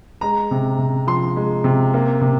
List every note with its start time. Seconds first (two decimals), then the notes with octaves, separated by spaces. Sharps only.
0.21 G#3 A#5
0.51 C3
0.78 C3
1.07 F3 C6
1.36 G#3
1.64 C3
1.94 A#3
2.21 C3